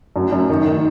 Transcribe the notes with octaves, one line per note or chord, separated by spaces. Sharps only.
F#2
F#2
D#3
D#3